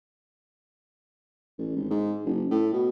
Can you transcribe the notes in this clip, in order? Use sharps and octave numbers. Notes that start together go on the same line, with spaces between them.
A1
G#1
G#2
F#1
A2
B2